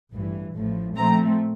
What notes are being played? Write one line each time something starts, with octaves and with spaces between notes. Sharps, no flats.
A1 G2 E3
A1 A2 F3
A#2 F3 A3 C4 A#5